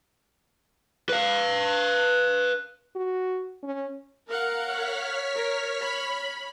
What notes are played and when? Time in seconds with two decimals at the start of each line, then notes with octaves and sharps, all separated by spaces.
1.09 B4 F5
2.96 F#4
3.63 C#4
4.28 A#4 F5 F#5
4.63 C#5 F6 B6
5.36 A#4
5.82 B5